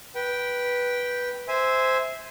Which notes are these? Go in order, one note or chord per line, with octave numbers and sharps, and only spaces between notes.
B4 G5
C5 E5 G#5